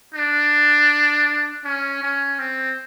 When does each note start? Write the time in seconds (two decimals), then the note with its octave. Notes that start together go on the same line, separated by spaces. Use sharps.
0.14 D4
1.64 C#4
2.02 C#4
2.39 C4